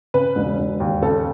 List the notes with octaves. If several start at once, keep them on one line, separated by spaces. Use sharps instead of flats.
C#3 B4
E1
E1
D#2
C#3 A4